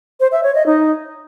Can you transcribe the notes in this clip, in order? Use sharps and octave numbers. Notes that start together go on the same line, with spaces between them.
C5
E5
C#5
D#5
D#4